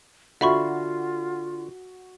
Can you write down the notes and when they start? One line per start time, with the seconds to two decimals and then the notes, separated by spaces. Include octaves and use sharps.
0.41 D3 F4 F#4 E5 B5 C#6